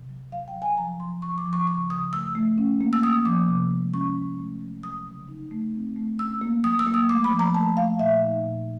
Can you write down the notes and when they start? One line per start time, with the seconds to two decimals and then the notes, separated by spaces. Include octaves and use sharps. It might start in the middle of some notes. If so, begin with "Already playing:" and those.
Already playing: C3
0.09 F#3
0.32 F#3 F5
0.48 G5
0.55 F#3
0.62 G#5
0.77 F3 A#5
1.00 F3 C6
1.22 F3 C#6
1.38 D6
1.45 F3
1.53 C#6
1.67 C#3 C#6
1.90 C#3 D#6
2.13 A3 E6
2.35 A3
2.58 C#4
2.81 A#3
2.93 E6
3.03 A#3 D#6
3.25 F3 D6
3.48 C3
3.71 G#3
3.94 C#4 C#6
4.16 G#3
4.39 A3
4.61 F#3
4.83 F#3 D#6
5.06 C#3
5.29 D#4
5.51 A3
5.74 C4
5.96 A3
6.19 C#4 E6
6.41 A#3
6.64 F#3 D#6
6.79 E6
6.87 A#3
6.94 D#6
7.09 A3 D6
7.24 B5
7.32 F3
7.39 A#5
7.54 A3 A5
7.77 A3 F5
7.99 A#2 E5
8.22 D#4
8.45 A#2